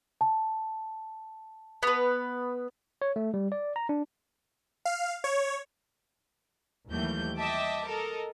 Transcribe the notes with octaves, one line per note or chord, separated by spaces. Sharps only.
A5
B3 B4
C#5
A3
G3
D5
A#5
D4
F5
C#5
D#2 E3 F#3 G3 A3 G6
D#5 E5 G5 A5 D6
A4 A#4 D#5